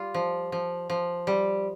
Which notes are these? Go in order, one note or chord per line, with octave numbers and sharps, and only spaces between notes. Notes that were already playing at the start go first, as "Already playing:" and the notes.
Already playing: G3 F4
F3
F3
F3
G3